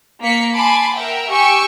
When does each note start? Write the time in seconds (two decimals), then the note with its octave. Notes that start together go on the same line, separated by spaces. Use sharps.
0.22 A#3 B6 C#7
0.54 G#5 A5 B5 C6 D6
0.96 A#4 E5 F#5 G5
1.31 G4 G5 G#5 C#6 E6